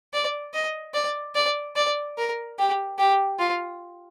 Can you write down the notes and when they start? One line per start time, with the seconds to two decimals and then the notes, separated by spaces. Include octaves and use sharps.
0.14 D5
0.54 D#5
0.94 D5
1.35 D5
1.76 D5
2.18 A#4
2.59 G4
2.98 G4
3.39 F4